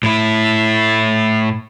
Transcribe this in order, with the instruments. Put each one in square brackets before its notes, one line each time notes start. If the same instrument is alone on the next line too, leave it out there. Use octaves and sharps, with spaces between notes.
[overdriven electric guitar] A2 E4